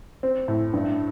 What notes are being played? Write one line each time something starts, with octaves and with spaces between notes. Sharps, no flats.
C4
A2
G2